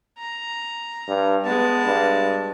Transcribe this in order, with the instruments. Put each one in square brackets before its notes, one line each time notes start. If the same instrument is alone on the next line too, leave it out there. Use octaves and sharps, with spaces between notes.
[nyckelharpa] A#5
[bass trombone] G2
[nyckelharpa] G#3 A5 [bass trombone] B3
[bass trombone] G2